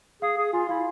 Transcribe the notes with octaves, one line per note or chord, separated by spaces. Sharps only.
G#4 F5
G#4
F4 G#5
E4 F5